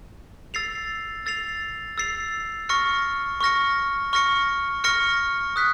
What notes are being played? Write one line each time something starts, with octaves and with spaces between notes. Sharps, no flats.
E6 A6 C7 F7
E6 A6 C7 F7
E6 A6 C7 F7
C#6 F6 A#6 C#7
C#6 F6 A#6 C#7
C#6 F6 A#6 C#7
C#6 F6 A#6 C#7
D#6 F#6 B6